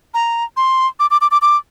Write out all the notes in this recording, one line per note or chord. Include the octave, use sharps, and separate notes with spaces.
A#5
C6
D6
D6
D6
D6
D6